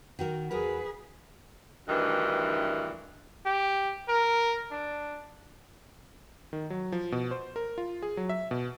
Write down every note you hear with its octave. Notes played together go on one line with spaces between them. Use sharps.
D#3 F#4 A#4
E2 F#4 G#4 A#4 B4
D2 G2 D#3 E3
G4
A#4
D4
D#3
F#3
F3
B2
C5
A#4
F4
G#4
F#3
E5
B2